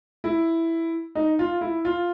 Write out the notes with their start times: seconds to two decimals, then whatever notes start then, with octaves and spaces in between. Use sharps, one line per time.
0.24 E4
1.15 D#4
1.39 F4
1.61 E4
1.85 F4